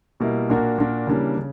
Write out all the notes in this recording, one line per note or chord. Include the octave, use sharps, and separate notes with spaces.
B2 G3 A#3 E4
A#2 A#3 D4 F#4 A#4
A#2 A#3 D4 F#4 A#4
C#3 E3 G3 A#3 D4
C#3